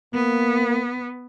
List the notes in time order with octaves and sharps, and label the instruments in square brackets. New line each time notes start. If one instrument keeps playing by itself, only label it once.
[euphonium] A#3 [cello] B3